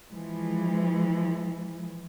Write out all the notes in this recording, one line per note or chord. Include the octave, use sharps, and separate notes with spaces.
E3 F3 G#3